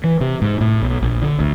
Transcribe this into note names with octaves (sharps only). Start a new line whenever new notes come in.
E3
C3
G#2
A2
B1
A#1
D3
D2